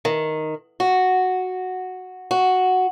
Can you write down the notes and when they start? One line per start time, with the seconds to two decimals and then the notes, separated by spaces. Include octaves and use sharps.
0.05 D#3
0.80 F#4
2.31 F#4